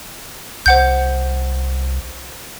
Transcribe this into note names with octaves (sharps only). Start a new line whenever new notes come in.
C2 C5 F#5 G6